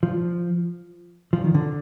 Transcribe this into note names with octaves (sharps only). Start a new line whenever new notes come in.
F3
F3
D#3
D3